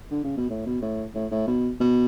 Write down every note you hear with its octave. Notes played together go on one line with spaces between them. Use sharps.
D3
C#3
B2
A2
B2
A2
A2
A2
B2
B2